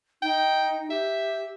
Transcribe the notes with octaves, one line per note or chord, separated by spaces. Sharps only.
D#4 G5
G4 E5